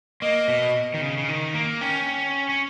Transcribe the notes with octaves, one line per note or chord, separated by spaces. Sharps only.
A#3 D#5
B2
D#3
C#3
C#3
D#3
A#3
C#4 G5
C#4